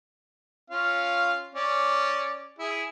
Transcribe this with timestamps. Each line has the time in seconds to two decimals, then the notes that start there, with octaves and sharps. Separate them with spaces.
0.70 C#4 F4 F5
1.55 C#4 D5
2.59 E4 G#4